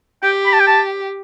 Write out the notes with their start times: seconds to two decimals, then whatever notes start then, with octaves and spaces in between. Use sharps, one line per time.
0.23 G4 G5
0.46 B5
0.53 A5
0.60 G5
0.67 A5